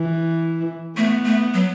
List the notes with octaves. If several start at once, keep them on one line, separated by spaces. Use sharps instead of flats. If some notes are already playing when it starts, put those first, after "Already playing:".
Already playing: E3
A3 B3
A3
F#3